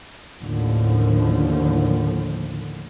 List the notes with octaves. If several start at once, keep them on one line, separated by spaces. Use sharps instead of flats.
A1 D#2 A2 D3 F3